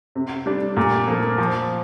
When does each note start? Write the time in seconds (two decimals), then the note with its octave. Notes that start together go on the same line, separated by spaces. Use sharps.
0.15 C3
0.46 G3 D4
0.77 A#2
1.07 F3 A#3
1.38 F3